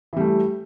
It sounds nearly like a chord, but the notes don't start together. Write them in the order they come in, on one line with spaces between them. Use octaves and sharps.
E3 G3 A3